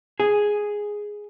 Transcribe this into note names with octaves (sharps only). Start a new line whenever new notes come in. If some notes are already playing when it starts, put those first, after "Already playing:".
G#4